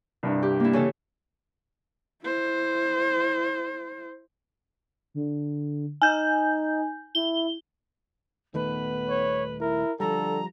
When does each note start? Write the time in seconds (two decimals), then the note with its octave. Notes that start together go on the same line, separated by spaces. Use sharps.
0.23 C2 G2
0.42 G4
0.60 A#3 E4
0.73 C#3 E3 A4
2.23 E4 C5
5.14 D3
6.02 D#4 G#5 G6
7.15 E4 G7
8.54 D#1 D#3 A3 B3 B4
9.10 C#5
9.61 E4 A#4
10.00 D3 F3 G3 A4 A#5